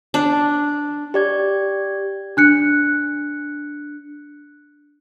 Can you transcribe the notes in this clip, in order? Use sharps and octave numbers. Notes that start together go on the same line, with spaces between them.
D4
G4 D5 G#6
D4 F#6 C#7